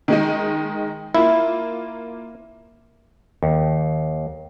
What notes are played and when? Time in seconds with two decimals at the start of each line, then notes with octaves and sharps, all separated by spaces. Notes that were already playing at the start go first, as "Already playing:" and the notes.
0.08 D#3 G#3 D#4
1.15 A#3 E4 F4
3.43 D#2